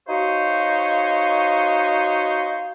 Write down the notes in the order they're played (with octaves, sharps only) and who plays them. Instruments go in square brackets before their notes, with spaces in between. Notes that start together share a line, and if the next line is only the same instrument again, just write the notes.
[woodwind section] D#4 F#4 C5 C#5 F5